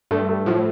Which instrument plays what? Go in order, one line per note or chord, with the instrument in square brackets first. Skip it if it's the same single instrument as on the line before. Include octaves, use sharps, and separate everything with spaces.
[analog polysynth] G2 [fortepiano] A3
[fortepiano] A3
[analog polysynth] A2 [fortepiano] F3